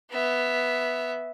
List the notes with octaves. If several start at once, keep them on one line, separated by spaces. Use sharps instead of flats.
B3 E5